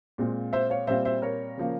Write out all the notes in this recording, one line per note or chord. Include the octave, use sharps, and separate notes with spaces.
A#2 G#3 C4 F4
C5 E5
C#5 F5
A#2 G3 C4 F4 C5 E5
C5 E5
A#4 C#5
C#3 F3 A#3